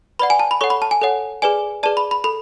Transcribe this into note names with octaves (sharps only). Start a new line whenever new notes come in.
B4 D5 F#5 B5
G#5
A5
B5
A4 C#5 F#5 C#6
B5
A5
G#5
A4 C#5 F#5
G#4 B4 D5 G#5
G#4 B4 D5 A5
B5
B5
A4 B5